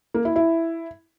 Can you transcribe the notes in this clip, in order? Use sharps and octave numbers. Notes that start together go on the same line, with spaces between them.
A#3
E4
E4